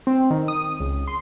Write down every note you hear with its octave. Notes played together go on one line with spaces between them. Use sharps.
C4
D#3
D#6
C#2
C6